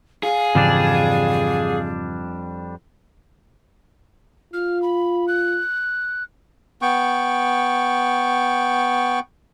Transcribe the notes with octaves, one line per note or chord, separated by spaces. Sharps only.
G#4 F5
F2 G#2 C#3 E3 G3 D4
F4 F6
B5
F#6
B3 G5 C#6